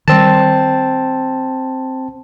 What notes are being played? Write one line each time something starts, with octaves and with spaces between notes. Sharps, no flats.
D#3 G3 C4 A5